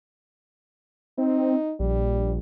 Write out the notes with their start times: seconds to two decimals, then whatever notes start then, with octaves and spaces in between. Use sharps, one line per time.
1.18 C4 D#4
1.80 A#1 G3